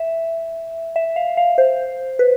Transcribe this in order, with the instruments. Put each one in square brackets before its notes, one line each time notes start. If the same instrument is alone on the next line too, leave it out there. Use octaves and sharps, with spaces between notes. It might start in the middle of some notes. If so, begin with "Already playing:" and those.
Already playing: [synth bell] E5
E5
F5
F5
C5
B4